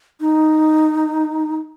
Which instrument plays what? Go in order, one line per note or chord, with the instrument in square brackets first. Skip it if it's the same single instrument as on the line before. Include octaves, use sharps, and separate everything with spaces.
[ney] D#4